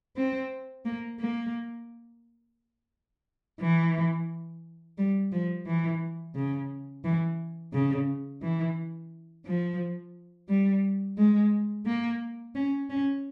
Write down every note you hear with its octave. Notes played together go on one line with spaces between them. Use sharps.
C4
A#3
A#3
E3
G3
F3
E3
C#3
E3
C#3
E3
F3
G3
G#3
A#3
C#4
C#4